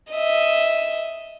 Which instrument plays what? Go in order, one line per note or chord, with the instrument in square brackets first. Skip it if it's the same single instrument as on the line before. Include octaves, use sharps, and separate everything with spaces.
[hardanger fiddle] D#5 E5